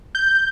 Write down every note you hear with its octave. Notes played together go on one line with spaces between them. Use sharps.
G6